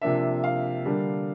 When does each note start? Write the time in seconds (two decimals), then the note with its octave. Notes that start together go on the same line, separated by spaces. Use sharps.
0.02 C3 F3 A#3 D4 E5
0.44 F5
0.85 D3 G3 A#3 D4